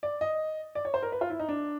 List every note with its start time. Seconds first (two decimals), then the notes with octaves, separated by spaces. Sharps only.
0.03 D5
0.21 D#5
0.75 D5
0.85 C#5
0.94 C5
1.03 A#4
1.12 B4
1.21 F4
1.30 E4
1.39 D#4
1.49 D4